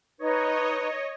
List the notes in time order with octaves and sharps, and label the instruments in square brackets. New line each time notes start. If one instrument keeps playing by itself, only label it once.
[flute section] D#4 B4 [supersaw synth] C#5 D#5